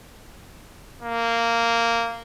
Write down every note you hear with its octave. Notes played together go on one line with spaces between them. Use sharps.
A#3